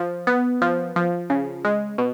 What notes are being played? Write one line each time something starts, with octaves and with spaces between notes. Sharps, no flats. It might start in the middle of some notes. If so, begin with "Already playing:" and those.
Already playing: F3
B3
F3
F3
C#3
G#3
B2